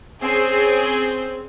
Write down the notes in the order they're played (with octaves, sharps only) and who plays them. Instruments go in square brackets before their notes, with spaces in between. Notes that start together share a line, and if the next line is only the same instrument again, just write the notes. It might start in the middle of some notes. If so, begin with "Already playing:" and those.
[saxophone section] C4 [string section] C#4 G#4